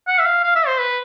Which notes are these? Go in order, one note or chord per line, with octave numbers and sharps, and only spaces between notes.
F#5
E5
F5
F5
E5
C5
B4